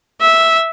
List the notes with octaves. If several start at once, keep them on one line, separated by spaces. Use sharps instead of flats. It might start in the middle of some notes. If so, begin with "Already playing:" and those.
E5